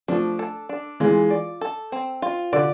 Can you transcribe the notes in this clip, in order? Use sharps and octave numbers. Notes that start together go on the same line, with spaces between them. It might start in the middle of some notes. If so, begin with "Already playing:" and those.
F3 A3 D4
A4
D4
E3 G#3 F4
D5
A4
C4
F4
D3 D5